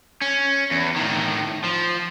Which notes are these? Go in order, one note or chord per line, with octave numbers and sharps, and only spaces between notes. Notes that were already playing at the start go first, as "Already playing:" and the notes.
C#4
E2
A2 D#3
F3